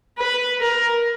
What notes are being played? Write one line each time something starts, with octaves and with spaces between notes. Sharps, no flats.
B4
A#4